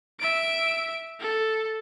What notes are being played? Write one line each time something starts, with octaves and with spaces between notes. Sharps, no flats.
E5 D7
A4